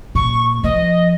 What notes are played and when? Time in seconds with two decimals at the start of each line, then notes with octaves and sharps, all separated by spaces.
0.15 A#2 C#6
0.64 F3 D#5